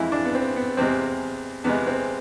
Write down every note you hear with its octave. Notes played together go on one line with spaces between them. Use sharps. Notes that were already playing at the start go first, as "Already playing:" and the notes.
Already playing: F2 E3 G#3 E4
D4
B3
C4
B3
E2 C3 G#3 C4
E2 C3 G#3 B3
C4